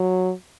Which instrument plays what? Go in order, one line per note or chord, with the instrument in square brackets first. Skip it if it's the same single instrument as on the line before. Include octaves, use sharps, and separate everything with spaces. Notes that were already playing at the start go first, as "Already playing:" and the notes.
Already playing: [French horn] F#3